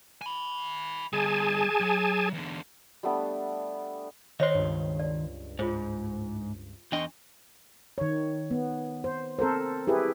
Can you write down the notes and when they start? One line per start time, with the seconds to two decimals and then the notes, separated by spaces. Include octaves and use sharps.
0.22 G#5 B5
1.13 D3 G3 G#4 G#5 A5
1.80 F#3
2.34 E2 D3
3.03 G3 A3 B3 D4
4.40 D#3 C5 C#5 D#5 C6 A#6
4.55 C#2 G2
5.00 D5
5.59 G#2 F4 G#4 C5
6.92 E2 D4 D#5 G5 C6 C#6
7.98 D#3 C#5
8.51 B3
9.04 C5
9.39 C4 A4 A#4 C5
9.87 E4 G4 G#4 B4